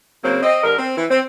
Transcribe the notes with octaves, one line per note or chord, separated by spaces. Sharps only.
C#3 F#3 A#3 C4
C4 D#5
D3 G3 A#4
C4
E3
C4